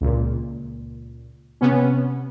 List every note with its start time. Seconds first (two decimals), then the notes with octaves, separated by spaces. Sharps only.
0.01 C#2 A#2
1.61 C3 B3 C#4